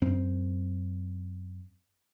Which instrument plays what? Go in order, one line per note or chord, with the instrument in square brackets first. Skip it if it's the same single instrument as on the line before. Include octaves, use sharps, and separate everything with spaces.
[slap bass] F#2 C4